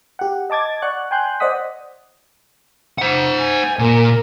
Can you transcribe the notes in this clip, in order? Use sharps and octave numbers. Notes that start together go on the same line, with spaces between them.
G4 F#5
D#5 A5 D6 G#6 A6
D5 F#5 C#6 F#6
G5 G#5 C6 F#6 G6
C5 D5 D#5 F#5 D#6 B6
C5 F#5
G#5
A#2 A#4